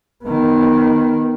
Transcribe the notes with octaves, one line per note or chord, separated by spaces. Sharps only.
D#3 B3